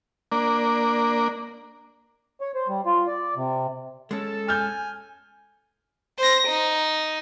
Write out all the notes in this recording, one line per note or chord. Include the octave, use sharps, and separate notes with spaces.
A#3 D4
C#5
C5
G3
F4
D5
C3
G#3 C#4 A4
G#5 F6 G6
C5 A#6
D#4